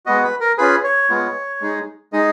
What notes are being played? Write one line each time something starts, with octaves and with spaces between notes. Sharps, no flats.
G#3 B3 F#4 D#5
B4
A#4
C#4 F4 G#4 B4
C#5
G#3 B3 F4
G#3 D#4 G#4
G#3 D#4 G#4 D#5